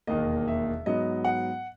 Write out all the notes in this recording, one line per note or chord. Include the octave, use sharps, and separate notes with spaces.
E1 D#2 D#3 A#3 D#5
E5
G#2 F#3 B3 D#5
F#5